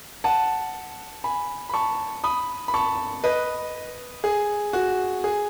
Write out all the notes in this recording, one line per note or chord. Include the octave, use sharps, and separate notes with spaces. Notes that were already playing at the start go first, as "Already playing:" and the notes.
F#5 A5
G#5 B5
B5
A5 C#6
B5 D#6
B5
A5 C#6
B4 D#5
G#4
F#4
G#4